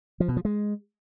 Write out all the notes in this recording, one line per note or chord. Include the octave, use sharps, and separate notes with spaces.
F3
B2
F3
G#3